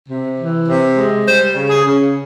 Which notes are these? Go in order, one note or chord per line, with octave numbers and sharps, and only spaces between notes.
C3
E3
C3
G#3
G3 C5
C#3
G#4
C#3